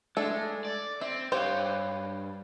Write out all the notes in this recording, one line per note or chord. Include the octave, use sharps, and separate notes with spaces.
G#3 A3 D4 A4
D5
C4 E5
G2 G4 C5 C#5 F5